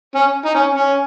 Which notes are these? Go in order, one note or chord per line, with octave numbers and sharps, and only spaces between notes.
C#4
D#4
C#4
C#4